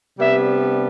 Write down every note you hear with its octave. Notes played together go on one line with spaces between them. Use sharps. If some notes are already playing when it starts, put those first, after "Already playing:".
C3 G3 B3 D4 E5